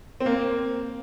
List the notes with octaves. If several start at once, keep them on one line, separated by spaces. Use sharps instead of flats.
C4
A#3